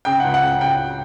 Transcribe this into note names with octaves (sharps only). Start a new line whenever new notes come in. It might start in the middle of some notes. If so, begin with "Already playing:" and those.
C#3 G5
C#2 F#5
F#5
C#3
C#2 G5